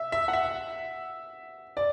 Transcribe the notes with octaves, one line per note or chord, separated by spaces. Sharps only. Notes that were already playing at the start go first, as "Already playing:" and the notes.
Already playing: E5
E5
F#5
E5
D5